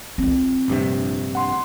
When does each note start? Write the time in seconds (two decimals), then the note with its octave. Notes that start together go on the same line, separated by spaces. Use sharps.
0.18 C4 F4
0.68 A#1 G2 C3
1.35 F#5 C6